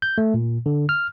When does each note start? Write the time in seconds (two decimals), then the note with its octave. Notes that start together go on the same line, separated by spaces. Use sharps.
0.02 G6
0.18 A3
0.34 A#2
0.66 D3
0.89 F6